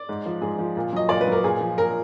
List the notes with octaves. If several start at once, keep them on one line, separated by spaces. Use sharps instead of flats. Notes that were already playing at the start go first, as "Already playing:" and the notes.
Already playing: D5
G#2
F3
G#2 G#4
F3
A#2
F#3 D#5
A#2 D5
B4
F#3 A#4
A#2 G#4
F3
A#2 A#4